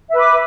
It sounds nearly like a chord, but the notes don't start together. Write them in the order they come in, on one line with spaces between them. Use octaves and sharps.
E5 B4 D6